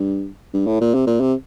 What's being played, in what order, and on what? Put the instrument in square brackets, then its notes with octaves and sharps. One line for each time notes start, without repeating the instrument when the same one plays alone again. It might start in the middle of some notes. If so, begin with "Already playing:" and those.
Already playing: [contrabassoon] G2
G2
A2
A#2
C3
A#2
C3